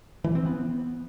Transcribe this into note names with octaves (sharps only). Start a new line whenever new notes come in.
E3
C4
B3